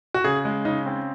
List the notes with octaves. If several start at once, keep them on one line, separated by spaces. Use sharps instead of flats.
F#4
C#3 G#4
G#3
C#3 D#4
C4